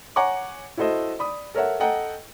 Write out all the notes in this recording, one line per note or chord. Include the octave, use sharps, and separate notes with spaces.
C#5 F#5 G#5 A#5 C#6 D6
E4 F#4 A4 C5 D#5
D5 B5 D#6
A4 A#4 C#5 E5 F#5
A4 D#5 F#5 G5 A#5